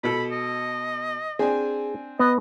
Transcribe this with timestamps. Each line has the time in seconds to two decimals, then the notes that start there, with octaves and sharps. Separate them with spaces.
0.04 B2 A4 B5
0.31 D#5
1.39 C4 D4 G#4 G#5
2.19 B3 D#5